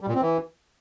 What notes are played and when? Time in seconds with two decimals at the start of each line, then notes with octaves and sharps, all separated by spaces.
0.01 G3
0.08 A#2
0.15 C4
0.22 E3